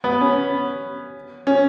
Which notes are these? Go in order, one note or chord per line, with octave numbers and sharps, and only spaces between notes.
B3
C#4
C#4